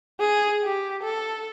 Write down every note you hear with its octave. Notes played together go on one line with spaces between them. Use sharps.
G#4
G4
A4